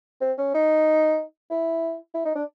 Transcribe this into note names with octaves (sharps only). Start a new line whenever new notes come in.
C4
C#4
D#4
E4
E4
D#4
D4